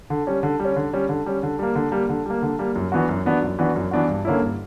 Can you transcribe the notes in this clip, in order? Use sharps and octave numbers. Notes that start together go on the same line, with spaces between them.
D3
G3 C#4
D3
G3
C#4
D3
G3 C#4
D3
G3 C#4
D3
G3 A#3
D3
G3 A#3
D3
G3 A#3
D3
G3 A#3
F#2
E3 B3 D4 F#4
F#2
E3 B3 D4 F#4
F#2
E3 B3 D4 F#4
F#2
E3 B3 D4 F#4
G2
D3 A#3 C#4 E4
G2